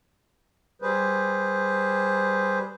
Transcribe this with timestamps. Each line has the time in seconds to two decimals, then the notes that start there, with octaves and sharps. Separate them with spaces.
0.82 G3 G#4 B4 C5